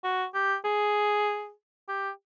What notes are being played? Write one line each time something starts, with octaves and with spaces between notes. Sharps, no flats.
F#4
G4
G#4
G4